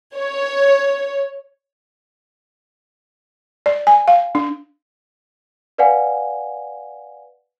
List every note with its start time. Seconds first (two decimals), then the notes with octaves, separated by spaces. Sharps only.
0.15 C#5
3.66 D5
3.87 G#5
4.08 F5
4.35 D4
5.78 B4 D5 F5 F#5 G#5